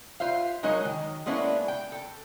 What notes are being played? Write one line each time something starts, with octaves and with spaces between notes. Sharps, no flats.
F4 C5 E5 F5
F#3 G#3 D#4 A#4 C#5 D#5
D#3
G#3 A#3 B3 C#4 D4 E4
G5
A4